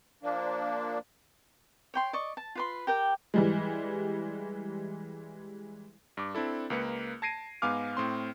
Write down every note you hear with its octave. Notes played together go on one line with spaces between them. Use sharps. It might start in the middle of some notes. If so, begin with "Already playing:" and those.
F3 A#3 D4
C#5 G5 C6
D5 D#5 C#6
A5
F4 B4 C6
G4 A#4 G5
E3 G3 G#3
G2 D6
C4 D4 E4 A4
C#2 A#3 B4 C#7
A5 G#6 A#6 C7 D7 D#7
G#2 B3 F5 G#5 D6 F6
A2 C4 C6